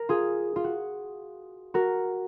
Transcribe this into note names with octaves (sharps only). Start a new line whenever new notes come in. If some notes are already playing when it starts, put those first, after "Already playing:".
Already playing: A#4
F4 G#4
F4
F#4
F#4 A#4